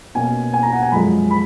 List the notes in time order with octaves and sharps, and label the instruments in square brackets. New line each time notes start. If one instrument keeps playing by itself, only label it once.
[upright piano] B2 A#3 C#4 G#5
G#5
A#5
F#5
G#5
F#2 F3 G#3 B5
B5